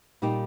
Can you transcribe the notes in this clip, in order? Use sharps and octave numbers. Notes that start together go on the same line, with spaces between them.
A#2 G3 A#3 D#4 G4